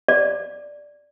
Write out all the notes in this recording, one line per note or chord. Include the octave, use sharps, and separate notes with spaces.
D5